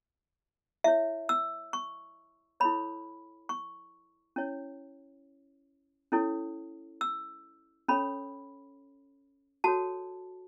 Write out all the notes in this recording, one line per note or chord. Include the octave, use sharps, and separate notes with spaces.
E4 C#5 E5
E6
C#6
E4 A4 C#5 B5
C#6
C#4 E4 C#5
C#4 E4 A4 C#5
E6
C#4 A4 C#5 B5
F#4 A4 C#5 A5